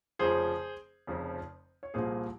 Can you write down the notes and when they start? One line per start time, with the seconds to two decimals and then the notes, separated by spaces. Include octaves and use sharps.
0.19 F1 F2 C#3 F3 G#4 C5
1.07 F1 F2 C#3 F3
1.83 C#5
1.94 C2 A#2 F3 A#3 G#4 C5